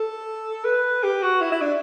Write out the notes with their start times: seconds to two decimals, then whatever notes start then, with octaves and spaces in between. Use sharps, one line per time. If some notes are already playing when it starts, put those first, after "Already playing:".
Already playing: A4
0.65 B4
1.03 G4
1.23 F#4
1.41 E4
1.52 E4
1.62 D4